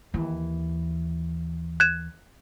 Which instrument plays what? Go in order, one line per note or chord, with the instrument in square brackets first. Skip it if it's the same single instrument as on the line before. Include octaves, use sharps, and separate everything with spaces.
[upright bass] D#2 E3
[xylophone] F#6 G#6 E7